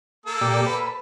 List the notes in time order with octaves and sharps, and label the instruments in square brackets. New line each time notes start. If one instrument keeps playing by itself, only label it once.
[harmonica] A#3 A4 E6
[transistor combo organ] A#2 G4 D5
B4